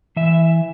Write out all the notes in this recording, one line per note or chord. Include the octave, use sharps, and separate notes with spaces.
E3 E5